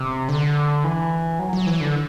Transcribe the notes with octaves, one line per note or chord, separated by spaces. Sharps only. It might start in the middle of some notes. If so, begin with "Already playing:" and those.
Already playing: C3
D3
E3
F#3
F#3
E3
D3